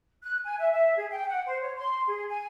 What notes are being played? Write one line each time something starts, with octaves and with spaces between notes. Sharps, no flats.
F#6
G#5
E5
E5
G#4
G5
F#5
C5
C#5
C6
G#4
G#5